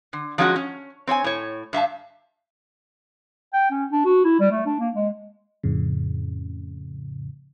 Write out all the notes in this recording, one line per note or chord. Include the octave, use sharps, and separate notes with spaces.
D3
F3 F#3 G#3 C#4 E4 F#4
C#4
C4 C#5 D#5 G#5
A2 C#5
G2 E5 F5 A5
G5
C#4
D4
F#4
E4
G3
A3
D4
A#3
G#3
F2 A2 C#3